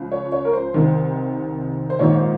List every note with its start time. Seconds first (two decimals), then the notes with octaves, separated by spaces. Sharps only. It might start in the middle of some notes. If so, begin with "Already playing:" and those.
Already playing: C#2 C#3 F3
0.12 C#5
0.32 C#5
0.45 A#4
0.53 C5
0.74 C2 C3 D#3
1.90 C5
1.99 A#1 G#2 D#3 C#5
2.15 C5